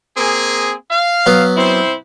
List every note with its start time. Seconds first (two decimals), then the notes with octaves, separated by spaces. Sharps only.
0.17 A#3 C4 G#4
0.90 F5
1.26 F#3 B3
1.57 C4 E4 C5